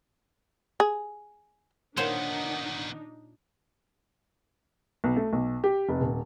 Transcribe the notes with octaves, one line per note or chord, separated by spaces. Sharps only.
G#4
A#2 D#3 B3 D4 D#4 C5 C#5 F#5
B1
A3
B1
G4
F1
D#1